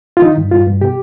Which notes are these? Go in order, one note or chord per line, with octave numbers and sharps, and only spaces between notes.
F4
D#3 D#4
G2
G2 F4
G2
B2 G4